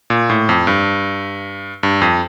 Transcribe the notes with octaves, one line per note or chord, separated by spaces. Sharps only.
A#2
A2
F2
G2
G2
F2